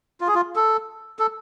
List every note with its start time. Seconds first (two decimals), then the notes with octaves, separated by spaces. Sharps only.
0.21 F4
0.27 G#4
0.35 F4
0.56 A4
1.19 A4